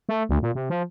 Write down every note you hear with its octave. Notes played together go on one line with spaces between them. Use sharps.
A3
D2
A#2
C3
F3